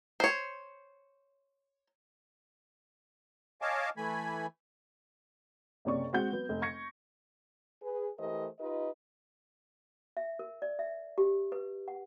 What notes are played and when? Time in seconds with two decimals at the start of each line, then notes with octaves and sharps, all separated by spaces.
0.20 C5 C#5
3.62 C#5 D#5 F5 G#5 A5 D6
3.97 E3 A3 G#5 B5
5.85 F#1 C3 C#4 D5 C#6
6.13 G#3 C4 F#4 F#5 G6
6.32 F#3 B3
6.49 F1
6.62 C#6 G#6 A#6 C#7
7.82 G#4 B4
8.19 E3 A3 G4 A#4 C5 D#5
8.59 D#4 F4 G4 B4 D#5
10.17 E5
10.39 A#4
10.62 D5
10.79 E5
11.18 G4
11.52 B4
11.88 F#5